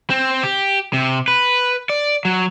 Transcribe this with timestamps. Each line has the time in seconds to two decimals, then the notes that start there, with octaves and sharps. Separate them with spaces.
0.10 C4
0.43 G4
0.93 C3
1.28 B4
1.89 D5
2.25 F#3